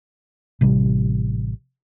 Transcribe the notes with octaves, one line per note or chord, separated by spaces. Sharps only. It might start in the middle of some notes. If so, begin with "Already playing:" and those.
A1 C3 G3